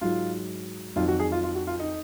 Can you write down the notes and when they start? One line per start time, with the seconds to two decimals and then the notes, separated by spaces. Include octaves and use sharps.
0.01 G#2 F#3 F4
0.96 F2 D#3 F#3 F4
1.08 F#4
1.19 G#4
1.32 F4
1.44 F4
1.55 F#4
1.67 F4
1.80 D#4